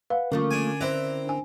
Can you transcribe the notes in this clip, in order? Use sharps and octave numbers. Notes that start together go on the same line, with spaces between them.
B4 F5 F#5
D3 F3 A3 A#3 C#4 A#4
D4 G#5
C4 E4 B4 D5 A#5
D4 G#5